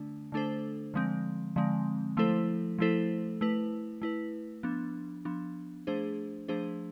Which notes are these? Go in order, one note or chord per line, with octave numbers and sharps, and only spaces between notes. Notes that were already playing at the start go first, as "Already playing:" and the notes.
Already playing: D3 A3 D4
D3 A3 D4 A4 C5
D3 F3 G#3 C4
D3 F3 G#3 C4
F3 A3 E4 A4 C5
F3 A3 E4 A4 C5
A3 E4 B4
A3 E4 B4
F3 B3 D4
F3 B3 D4
F3 A3 D4 G#4 C5
F3 A3 D4 G#4 C5